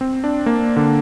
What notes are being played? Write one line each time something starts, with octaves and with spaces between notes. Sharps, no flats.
C4
D4
A#3
D3